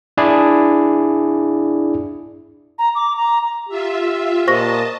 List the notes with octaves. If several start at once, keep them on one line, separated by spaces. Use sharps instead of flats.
D4 E4 G#4 D5
A#5
D6
A#5
F4 G4 E5
A#2 C5 D#5 A5 C#6 A#6